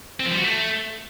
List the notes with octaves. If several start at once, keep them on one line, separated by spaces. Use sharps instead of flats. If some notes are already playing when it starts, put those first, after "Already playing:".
C4
F3
G3
F#4
A3